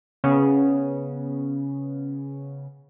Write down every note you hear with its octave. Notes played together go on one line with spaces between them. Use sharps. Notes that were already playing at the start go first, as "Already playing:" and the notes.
C#3 B3 C#4